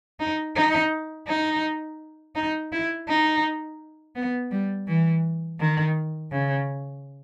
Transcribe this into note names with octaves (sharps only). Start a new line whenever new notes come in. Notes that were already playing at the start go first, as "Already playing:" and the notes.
D#4
D#4
D#4
D#4
E4
D#4
B3
G3
E3
D#3
C#3